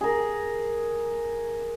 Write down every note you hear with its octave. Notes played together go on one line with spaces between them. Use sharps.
G#4 A#4